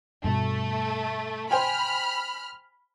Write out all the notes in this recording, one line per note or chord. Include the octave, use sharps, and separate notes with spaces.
G2 B2 A3
C5 G5 G#5 B5 F6